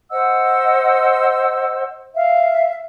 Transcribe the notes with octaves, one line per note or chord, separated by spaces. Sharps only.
C5 D#5 F#5 E6
E5 F5